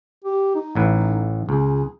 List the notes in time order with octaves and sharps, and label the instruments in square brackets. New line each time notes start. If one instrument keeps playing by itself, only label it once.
[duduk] G4
D#4
[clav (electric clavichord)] A1 A2 B4
[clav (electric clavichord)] C#2 [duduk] G#4